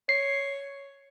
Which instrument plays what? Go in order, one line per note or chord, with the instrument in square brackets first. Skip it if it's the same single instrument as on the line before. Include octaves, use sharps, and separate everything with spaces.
[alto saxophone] C#5 [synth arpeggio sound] C7